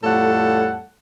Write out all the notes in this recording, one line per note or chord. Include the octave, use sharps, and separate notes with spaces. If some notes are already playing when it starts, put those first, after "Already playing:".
F2 A2 G3 A4 F5 F#5